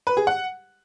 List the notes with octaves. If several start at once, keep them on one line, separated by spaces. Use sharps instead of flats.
B4
G#4
F#5